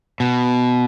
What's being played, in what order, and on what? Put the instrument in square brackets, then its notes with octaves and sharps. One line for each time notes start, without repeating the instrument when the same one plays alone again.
[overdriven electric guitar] B2